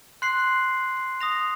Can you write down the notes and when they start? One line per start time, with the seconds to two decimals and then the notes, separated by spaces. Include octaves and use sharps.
0.22 C6 F#6 C7 F#7
1.21 D#6 A#6 F7